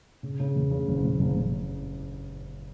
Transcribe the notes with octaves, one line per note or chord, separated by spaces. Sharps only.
C#3
C#3
E2
C#3
F#1
F#1
F#1
F#1